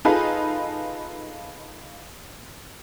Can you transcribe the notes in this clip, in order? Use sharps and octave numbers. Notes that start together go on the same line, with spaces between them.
D#4 F4 G#4 A4 B4